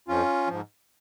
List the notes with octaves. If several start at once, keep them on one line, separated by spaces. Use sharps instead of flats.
F2 F3 C#4 F4
G#2 F3